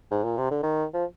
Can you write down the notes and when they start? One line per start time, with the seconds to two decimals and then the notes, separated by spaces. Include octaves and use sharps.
0.11 G#2
0.24 A#2
0.38 C3
0.51 D3
0.63 D#3
0.94 F3